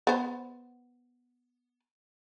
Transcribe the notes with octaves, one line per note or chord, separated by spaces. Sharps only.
B3 C5